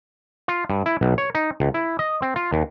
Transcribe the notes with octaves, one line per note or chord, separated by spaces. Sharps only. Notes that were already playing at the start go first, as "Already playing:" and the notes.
F4
G2
E4
B1
C#5
D#4
C#2
E4
D#5
C4
F4
D#2